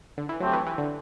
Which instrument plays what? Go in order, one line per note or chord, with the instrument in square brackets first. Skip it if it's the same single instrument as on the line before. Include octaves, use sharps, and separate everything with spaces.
[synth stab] D3
E3
[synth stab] F#3 [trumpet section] A3 C4 G4
[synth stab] E3
E3
D3